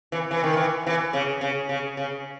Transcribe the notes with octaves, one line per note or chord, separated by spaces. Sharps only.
E3
E3
D#3
E3
E3
C#3
C#3
C#3
C#3